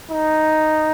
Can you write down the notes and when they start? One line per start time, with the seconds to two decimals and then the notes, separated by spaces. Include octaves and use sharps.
0.11 D#4